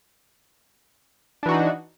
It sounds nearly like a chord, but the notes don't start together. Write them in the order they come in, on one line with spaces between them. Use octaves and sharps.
D4 E3 F#4 D#4